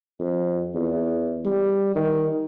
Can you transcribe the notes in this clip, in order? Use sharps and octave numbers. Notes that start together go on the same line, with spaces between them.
F2
E2
G3
D#3